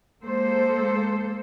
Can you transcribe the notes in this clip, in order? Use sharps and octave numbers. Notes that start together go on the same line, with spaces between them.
G#3 A#3 A4 C5